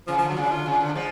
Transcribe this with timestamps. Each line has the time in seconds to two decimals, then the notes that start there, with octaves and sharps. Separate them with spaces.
0.07 C#3 F3
0.18 D3 F3
0.30 F#3
0.37 C#3 D4
0.51 D3 F4
0.66 C#3 C#4
0.73 D4
0.81 D3
0.95 F3 G#3